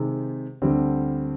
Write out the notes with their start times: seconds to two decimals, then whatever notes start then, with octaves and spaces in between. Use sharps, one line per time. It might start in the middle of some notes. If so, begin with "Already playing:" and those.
Already playing: C3 D#3 G#3
0.62 D2 D3 G3 C4